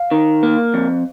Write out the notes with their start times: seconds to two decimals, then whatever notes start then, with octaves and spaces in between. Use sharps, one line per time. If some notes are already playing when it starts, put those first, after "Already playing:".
Already playing: F5
0.11 D#3
0.43 A#3
0.74 F2